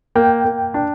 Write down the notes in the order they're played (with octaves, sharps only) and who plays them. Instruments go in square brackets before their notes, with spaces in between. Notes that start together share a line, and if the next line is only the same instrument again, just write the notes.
[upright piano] A#3 [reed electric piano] G5
[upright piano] A#3
D4